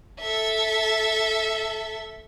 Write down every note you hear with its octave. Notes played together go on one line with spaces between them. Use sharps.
A4 E5